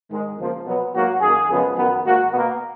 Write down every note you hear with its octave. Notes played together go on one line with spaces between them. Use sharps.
G#2 D#3 G#3
F2 C#3 F3 A#3
B2 F#3 B3
G#2 F#3 A#3 F#4
F#2 D#3 A#3 G#4
F#2 C#3 F3 G#3 B3
F#2 D#3 F#3 B3
G#2 D#3 A#3 F#4
B2 A#3 B3